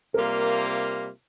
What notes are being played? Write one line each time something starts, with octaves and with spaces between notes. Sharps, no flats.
C3 G3 A#3 F4 A#4